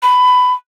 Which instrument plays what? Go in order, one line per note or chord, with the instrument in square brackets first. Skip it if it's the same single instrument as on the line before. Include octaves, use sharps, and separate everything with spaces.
[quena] B5